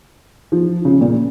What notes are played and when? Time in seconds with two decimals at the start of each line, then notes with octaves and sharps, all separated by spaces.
0.52 F3
0.85 C#3
1.01 A#2